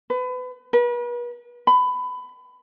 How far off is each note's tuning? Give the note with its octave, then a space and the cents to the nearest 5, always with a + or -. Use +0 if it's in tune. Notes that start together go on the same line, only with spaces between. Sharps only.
B4 +30
B4 -40
B5 +20